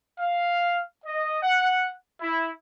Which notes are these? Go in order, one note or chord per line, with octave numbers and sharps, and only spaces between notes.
F5
D#5
F#5
E4